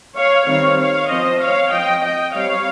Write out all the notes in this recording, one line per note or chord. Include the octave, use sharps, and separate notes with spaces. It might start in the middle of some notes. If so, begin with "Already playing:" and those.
C#5 F5
D#3 G3 C4 C#5 F5
C#5 F5
F3 C4 C5 D#5
C#5 F5
F3 C4 D#5 G5
D#5 G5
G3 C4 C#5 F5